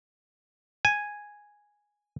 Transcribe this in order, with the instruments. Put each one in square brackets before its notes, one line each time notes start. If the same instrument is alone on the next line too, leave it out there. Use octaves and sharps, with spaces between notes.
[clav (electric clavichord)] G#5